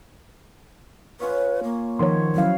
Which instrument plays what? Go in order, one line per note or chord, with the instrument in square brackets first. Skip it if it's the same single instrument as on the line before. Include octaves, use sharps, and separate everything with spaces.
[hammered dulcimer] C#4 F4 C#5 [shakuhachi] B4
[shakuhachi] A#3
[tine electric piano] D#3 C6 [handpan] F3 C#5 [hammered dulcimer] F#5
[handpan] F#3 C#4 F5 [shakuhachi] E4